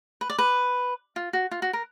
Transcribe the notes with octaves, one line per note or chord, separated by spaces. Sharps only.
B4
D5
B4
F4
F#4
F4
F#4
A#4